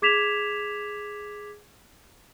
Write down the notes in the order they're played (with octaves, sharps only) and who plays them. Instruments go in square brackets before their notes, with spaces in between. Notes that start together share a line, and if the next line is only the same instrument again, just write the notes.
[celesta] G#4 D6 G#6 B6 E7 F7